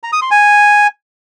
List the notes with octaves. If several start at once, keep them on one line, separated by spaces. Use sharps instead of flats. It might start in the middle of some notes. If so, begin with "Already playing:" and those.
A#5
D#6
C6
G#5